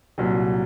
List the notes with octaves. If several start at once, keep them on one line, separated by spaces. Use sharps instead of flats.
C2 A#2 F#3